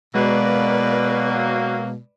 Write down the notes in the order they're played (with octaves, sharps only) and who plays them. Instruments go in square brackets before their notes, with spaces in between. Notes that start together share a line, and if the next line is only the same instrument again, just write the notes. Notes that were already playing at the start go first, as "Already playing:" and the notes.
[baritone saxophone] B2 [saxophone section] F#3 A#3 [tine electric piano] G#3 [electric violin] B4 D5